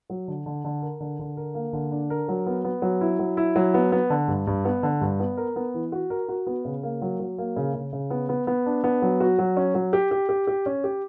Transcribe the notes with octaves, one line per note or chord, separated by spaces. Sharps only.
F#3
D3
D3
D3
A#4
D3
D3
A#4
A#3
D3
D4
A#4
F#3
B3
B3
F#3
E4
F#3
E4
F#3
B3
B3
D3
G2
G2
B3
D3
G2
B3
A#4
B3
E3
F#4
A#4
F#4
B3
C#3
A#3
F#3
F#3
A#3
C#3
C#3
C#3
B3
B3
B3
D4
B3
F#3
F#4
F#3
C#4
F#3
G4
G4
G4
G4
C#4
G4